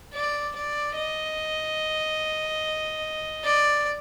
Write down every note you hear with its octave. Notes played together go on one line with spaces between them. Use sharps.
D5
D5
D#5
D5